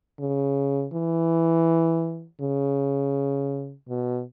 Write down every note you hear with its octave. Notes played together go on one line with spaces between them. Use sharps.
C#3
E3
C#3
B2